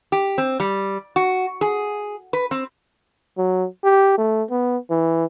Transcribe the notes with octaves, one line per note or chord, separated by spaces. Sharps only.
G4
C4
G3
F#4
G#4
B4
C4
F#3
G4
A3
B3
E3